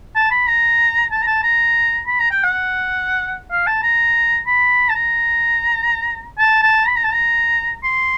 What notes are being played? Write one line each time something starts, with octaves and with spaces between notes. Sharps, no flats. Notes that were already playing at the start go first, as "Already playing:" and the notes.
A5
B5
A#5
A5
A#5
A5
A#5
B5
A#5
G5
F#5
F5
A5
A#5
B5
A5
A#5
A5
A5
B5
A#5
A5
A#5
C6